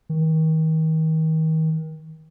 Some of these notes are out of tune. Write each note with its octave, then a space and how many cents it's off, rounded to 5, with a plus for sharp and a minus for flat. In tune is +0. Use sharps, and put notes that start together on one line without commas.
D#3 +35